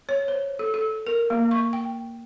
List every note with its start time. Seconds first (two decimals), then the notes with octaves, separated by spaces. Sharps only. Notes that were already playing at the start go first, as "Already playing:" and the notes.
0.09 C#5
0.28 C5
0.59 A4
0.74 A4
1.07 A#4
1.30 A#3
1.51 C#6
1.73 G5